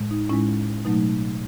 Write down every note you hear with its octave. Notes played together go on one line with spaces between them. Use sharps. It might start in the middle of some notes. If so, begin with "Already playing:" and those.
Already playing: A2 G#3
D#4
A2 G#3 C#4 E4
B2 F#3 A3 D#4